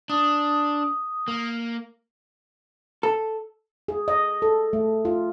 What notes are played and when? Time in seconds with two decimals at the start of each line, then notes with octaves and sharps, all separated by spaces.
0.10 D4 D#6
1.28 A#3
3.03 A4
3.88 G#4
4.08 D#5
4.42 A4
4.73 A3
5.05 F4